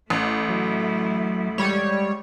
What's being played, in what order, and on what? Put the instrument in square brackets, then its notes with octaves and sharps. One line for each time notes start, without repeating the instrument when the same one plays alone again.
[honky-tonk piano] A1 [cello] A3 E4
[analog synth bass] F#3
[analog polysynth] G3 C#5 [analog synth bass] G#3